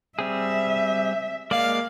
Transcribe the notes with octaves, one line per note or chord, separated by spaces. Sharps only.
G3 C4 G#4 E5
G#3 A#3 D5 F5